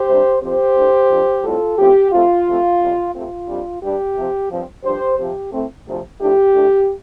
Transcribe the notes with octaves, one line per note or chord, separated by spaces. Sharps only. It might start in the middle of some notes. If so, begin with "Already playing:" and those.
Already playing: G4 C5
C3 G3 D4
F2 F3 C4 G4 C5
A2 A3 D4
F2 F3 D4
A2 G3 C4 F4 A4
A2 F3 C4 G4
C3 F3 A3 C4 F4
C3 F3 A3 C4
F2 C3 G3
C3 A3 C4 F4
F2 C3 G3 D4
G2 G3 D4 G4
C3 F3 C4
G2 F3 C4
G2 F3 D4 G4 C5
C3 F3 C4 G4
A2 A3 C4
D2 C3 F3
A2 F3 D4 G4
A2 A3 D4